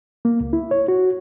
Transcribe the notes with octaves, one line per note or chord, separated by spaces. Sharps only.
A#3
C#2
E4
C#5
F#4